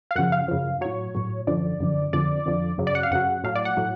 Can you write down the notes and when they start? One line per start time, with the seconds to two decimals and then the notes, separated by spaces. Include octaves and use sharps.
0.11 F5
0.15 F#2 C#3 F3 F#5
0.32 F5
0.48 F#2 C#3 F3
0.81 A2 F#3 C#5
1.15 A2 F#3
1.47 F#2 D3 F3 D5
1.80 F#2 D3 F3
2.13 F2 D3 F3 D5
2.46 F2 D3 F3
2.78 F#2 C#3 F#3
2.87 D5
2.95 F#5
3.03 F5
3.11 F#2 C#3 F#3 F#5
3.44 A2 F#3 F5
3.55 D5
3.65 F#5
3.77 A2 F#3